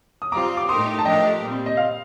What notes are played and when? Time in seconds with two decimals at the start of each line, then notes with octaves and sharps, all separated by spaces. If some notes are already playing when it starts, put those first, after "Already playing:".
0.22 D#6
0.32 G3 C4 F4 A#5 D6
0.57 D6
0.68 A2 A3 D#4 G4 A#4 C6 D#6
0.99 A5
1.05 F3 A3 D4 G4 A#4 D#5 G5
1.41 A#2 G3 C4
1.66 D#5
1.77 F5